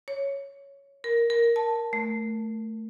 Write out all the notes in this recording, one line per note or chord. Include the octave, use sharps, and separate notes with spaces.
C#5
A#4
A#4
A5
A3